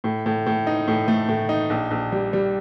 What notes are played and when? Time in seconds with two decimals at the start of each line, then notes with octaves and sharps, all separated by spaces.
0.04 A2
0.26 A2
0.46 A2
0.67 D#4
0.88 A2
1.08 A3
1.28 A2
1.49 D#4
1.70 A#1
1.91 A#1
2.12 G3
2.33 G3